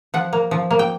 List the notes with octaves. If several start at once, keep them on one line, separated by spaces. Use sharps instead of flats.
F3 F#5
A#3
F3
A#3
G5